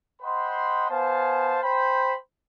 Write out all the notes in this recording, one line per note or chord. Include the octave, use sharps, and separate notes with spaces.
C5 D#5 F#5 G5 B5 C6
B3 C5 F5 G#5 A5
C5 G5 B5